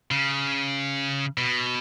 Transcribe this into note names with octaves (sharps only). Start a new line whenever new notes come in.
C#3
B2